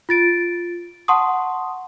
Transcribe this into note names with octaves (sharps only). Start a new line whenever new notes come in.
F4 A6 D7
F#5 A5 C6 C#6 D#6